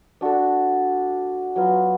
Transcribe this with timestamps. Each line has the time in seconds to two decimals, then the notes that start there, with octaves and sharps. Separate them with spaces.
0.21 D4 F#4 A4
1.56 F#3 B3 F4